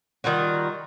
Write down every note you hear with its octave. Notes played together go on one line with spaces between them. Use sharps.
D#3 G3 F4 F#4